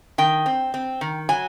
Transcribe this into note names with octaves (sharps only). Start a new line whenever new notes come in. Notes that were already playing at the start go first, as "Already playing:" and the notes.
D#3 G5
C4
C4
D#3
F#3 G#5